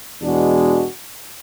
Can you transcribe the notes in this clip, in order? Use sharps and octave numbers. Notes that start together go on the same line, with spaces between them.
E2 B2 G#3 D4 F#4